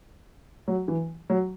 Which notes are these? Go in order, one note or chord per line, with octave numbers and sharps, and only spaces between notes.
F#3
E3
F#3